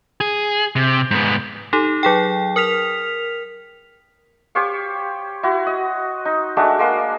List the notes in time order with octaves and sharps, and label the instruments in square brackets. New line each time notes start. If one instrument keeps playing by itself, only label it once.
[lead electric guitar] G#4
C3
G#2 B3
[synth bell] D#4 G4 A4
F#3 G#4 G5
A#4 F6 B6 F7
[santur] G4 C5 C#5 F5
E4 F#4
D#5
D#4
G#3 A3 D4 F#4
G#3 A#3 F5 C6